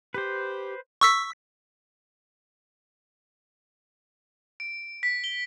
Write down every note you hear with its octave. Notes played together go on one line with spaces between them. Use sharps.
G4 B4 C5
C#6 E6 B6
D7
B6
G7